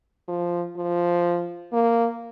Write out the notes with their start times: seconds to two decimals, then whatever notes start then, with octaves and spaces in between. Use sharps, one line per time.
0.28 F3
0.77 F3
1.73 A#3